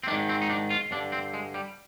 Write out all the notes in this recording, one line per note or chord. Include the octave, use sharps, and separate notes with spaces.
C4
G#2 D#3 D4
C4
D#4
D4
F4
G2 D3 D4
C4
G#3
G3